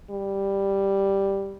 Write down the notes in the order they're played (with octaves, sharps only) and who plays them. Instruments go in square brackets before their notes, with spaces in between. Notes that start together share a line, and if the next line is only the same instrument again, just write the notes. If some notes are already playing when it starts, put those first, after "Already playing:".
[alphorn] G3